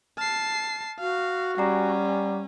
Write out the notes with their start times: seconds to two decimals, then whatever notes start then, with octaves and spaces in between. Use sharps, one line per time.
0.18 A5 F6 C7
1.00 F#4 F5
1.58 G3 C#4 F#5 G#5 A#5